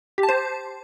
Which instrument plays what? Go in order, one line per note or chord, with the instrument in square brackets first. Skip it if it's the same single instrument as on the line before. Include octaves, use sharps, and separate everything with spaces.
[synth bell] G4
A5
C5